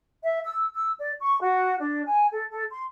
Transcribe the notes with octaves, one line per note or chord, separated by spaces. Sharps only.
E5
E6
E6
D5
C#6
F#4
D4
G#5
A4
A4
C6